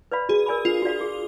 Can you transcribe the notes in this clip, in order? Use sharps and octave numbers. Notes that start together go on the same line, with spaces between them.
B4 D5 F5 B5
F#4 G#4
A#4 D5 G#5 B5
D4 F4
F#4 D5 F5
G#4